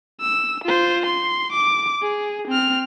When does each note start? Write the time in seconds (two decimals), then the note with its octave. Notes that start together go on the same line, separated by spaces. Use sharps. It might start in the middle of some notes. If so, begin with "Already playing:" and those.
0.21 E6
0.64 F4 C5
1.06 C6
1.52 D6
2.02 G#4
2.48 C4 F6